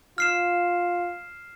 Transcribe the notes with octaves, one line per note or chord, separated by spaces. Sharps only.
F4 F6 C7 E7